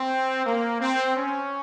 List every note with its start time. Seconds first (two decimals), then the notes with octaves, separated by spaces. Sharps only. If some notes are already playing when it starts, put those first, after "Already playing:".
Already playing: C4
0.45 A#3
0.80 C4
1.16 C#4